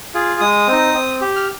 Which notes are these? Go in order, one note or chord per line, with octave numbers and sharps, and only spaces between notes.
F4 G#4
G#3 D#6
C4 D#4
C4
G4
F6